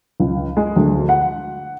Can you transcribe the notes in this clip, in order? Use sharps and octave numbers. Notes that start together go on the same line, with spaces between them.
C#2
G#3
D2
F#5